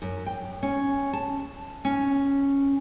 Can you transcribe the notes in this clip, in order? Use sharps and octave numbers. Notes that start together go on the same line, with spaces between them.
F#2
G5
C#4
A5
C#4